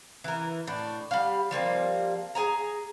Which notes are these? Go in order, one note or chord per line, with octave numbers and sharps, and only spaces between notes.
E3 A#4
A2 D4
G3 F5
F3 G3 A#3 C4
G#4 A#4 G#5 A#5